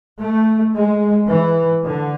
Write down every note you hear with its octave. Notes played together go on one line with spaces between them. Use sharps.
A3
G#3
E3
D3